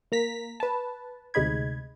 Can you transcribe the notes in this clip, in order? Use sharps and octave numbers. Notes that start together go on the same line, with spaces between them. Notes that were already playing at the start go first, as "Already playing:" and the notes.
A#3 A#5 B6
B4 A5
D2 C3 G#3 D#4 B5 G#6